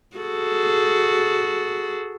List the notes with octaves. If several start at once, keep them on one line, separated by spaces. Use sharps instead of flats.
F#4 G#4 A4